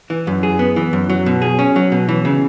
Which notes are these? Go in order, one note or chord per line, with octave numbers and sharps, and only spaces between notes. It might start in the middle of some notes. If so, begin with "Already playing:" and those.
E3
F#2
G#4
B3
E3
F#2
F#3
B2
G#4
C#4
F#3
B2
E3
C#3